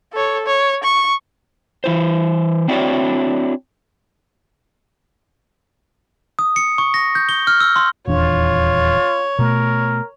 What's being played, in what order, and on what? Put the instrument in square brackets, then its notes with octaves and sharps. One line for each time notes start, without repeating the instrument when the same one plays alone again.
[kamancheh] A4 C#5
C#5
C#6
[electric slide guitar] E3 E4 C5
C4 D4 E4 F#4 C#5 D5
[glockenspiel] D#6
C#7
C#6
A#6
G6
G7
F6
E6
C6
[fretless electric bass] D#1 E2 D4 [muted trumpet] F4 [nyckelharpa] C#5
[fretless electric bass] B2 A3 [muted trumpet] A#4